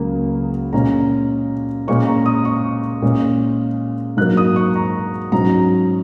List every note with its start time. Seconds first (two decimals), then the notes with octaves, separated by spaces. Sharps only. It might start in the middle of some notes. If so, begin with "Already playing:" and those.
Already playing: C#2 C#3 F#3 A#3
0.73 A#2 G#3 C#4 A#5
1.88 A#2 G#3 C#4 C#6
2.07 A#5
2.26 D#6
2.45 C#6
3.02 A#2 G#3 C#4
4.17 G#2 F#3 A#3 F#6
4.37 D#6
4.56 C#6
4.76 A#5
5.32 G#2 F#3 C#4 A#5